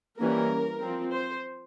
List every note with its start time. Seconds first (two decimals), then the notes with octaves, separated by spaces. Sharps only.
0.17 E3 G3 A#3 C#4 A#4
0.81 F3 C4
1.12 C5